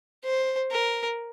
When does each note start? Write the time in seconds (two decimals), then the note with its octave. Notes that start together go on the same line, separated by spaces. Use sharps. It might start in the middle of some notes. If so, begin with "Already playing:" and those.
0.24 C5
0.71 A#4